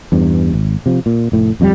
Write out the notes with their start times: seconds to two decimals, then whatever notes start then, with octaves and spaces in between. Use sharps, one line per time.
0.12 E2 G2
0.54 G#1
0.86 C3 F3
1.06 A#2
1.32 F1 A2
1.60 D1 F2 D#3 G3